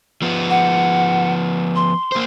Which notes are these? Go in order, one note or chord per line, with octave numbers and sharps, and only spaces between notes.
F3 B3
F#5
C6
A#3 C5